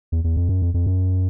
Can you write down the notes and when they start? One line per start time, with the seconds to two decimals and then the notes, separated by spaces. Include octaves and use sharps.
0.12 E2
0.24 E2
0.37 F2
0.49 F#2
0.62 F2
0.74 F2
0.86 F#2